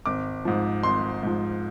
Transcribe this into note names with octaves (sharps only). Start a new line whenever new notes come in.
G#1 D6
G#2 F3
G#1 C6
G#2 F3